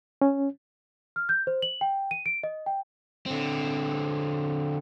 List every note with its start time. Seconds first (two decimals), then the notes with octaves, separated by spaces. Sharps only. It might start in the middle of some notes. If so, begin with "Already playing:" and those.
0.21 C#4
1.16 F6
1.29 G6
1.47 C5
1.62 F#7
1.81 G5
2.11 D#7
2.26 D7
2.43 D#5
2.66 G5
3.26 D3 C4